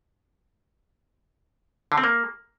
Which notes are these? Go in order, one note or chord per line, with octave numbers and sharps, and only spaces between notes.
D3
C4
A#3